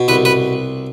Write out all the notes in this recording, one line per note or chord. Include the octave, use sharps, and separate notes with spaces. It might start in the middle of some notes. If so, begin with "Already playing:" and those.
Already playing: B2
C2 B4
B4